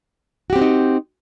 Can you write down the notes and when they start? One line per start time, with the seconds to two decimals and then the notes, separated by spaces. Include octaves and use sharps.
0.50 F#4
0.53 G4
0.56 C4
0.59 D4
0.62 D#4